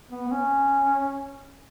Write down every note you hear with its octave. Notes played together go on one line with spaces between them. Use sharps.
B3
B3
C#4